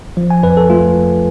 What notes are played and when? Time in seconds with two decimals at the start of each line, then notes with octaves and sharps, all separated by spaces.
0.17 F3
0.30 G#5
0.43 F2 B4
0.57 A4
0.70 A3 F4